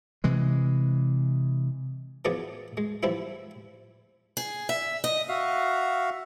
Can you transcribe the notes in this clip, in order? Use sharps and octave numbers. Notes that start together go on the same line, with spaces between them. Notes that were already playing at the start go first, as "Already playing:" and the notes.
C3 E3 G#3
E3 F3 B3 G#4 D5
G#3
E3 F3 G3 C4 E4
G#4
E5
D#5
F#4 E5 F5